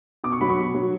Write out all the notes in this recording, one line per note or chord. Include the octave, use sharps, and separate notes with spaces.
B2 D6
C#6
F#3 B5
C#6
B2
F#3